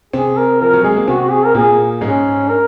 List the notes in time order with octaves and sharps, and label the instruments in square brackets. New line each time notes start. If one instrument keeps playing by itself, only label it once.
[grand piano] C3 C4 [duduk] G#4
[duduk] A#4
[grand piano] F3 [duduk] A#4
[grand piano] F#3
[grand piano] G#3 [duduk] G#4
[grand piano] A#3
[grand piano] C3 C4 [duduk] F#4
[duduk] G#4
A#4
[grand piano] A#2 A#3 [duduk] G#4
[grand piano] G#2 G#3 [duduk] C#4
[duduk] A#4